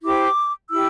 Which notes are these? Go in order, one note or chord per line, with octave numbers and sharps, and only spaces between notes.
E4 G4 C5 D6
E4 G4 E6